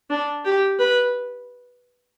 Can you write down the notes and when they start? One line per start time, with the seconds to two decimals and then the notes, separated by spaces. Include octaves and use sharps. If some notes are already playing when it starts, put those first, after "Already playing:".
0.10 D4
0.45 G4
0.79 B4